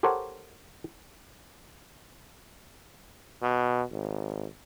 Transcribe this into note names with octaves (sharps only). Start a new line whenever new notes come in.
G4 A4 A#4 C5 C#5 F#5
B2
G#1